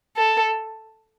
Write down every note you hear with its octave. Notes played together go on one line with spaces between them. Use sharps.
A4